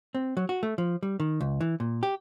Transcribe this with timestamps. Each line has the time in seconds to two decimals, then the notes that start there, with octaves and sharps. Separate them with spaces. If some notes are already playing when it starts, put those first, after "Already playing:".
0.15 C4
0.37 F#3
0.49 F#4
0.63 A3
0.78 F3
1.03 G3
1.20 D#3
1.41 C#2
1.61 E3
1.80 A#2
2.03 G4